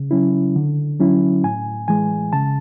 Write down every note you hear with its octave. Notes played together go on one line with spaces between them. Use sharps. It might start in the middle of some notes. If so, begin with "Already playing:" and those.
Already playing: C#3
F#3 C#4 E4
D3
F#3 C#4 E4
A2 G#5
E3 G#3 G#5
C#3 A5